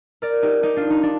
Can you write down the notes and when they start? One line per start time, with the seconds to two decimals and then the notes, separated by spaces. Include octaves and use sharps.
0.22 A#4 D5
0.42 D#4 G4
0.63 D#4 G4
0.76 D4 F4
0.90 D#4
1.03 D4